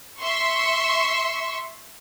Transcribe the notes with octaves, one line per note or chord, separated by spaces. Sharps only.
E5 C6 C#6